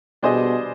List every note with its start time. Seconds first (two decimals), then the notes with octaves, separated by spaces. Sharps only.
0.22 B2 G3 D4 G#4 C5 D#5